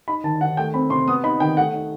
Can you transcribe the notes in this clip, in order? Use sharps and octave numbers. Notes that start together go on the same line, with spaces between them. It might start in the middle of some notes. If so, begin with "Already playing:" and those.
D#4 B5
D#3 A5
D#3 F#5
A3 G5
C4 B5
C3 C6
B3 D#6
D#4 B5
D#3 G5
A3 F#5
D#4